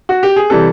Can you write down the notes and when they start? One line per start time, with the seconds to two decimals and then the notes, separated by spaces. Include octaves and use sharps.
0.09 F#4
0.23 G4
0.36 G#4
0.50 C3 E3 G3 A4